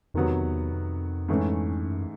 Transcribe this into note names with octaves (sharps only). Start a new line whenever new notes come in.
F2 C3 D#3 F#3 B3
E2
F2
E2
F2
G#2 E3 A3 C#4
F#2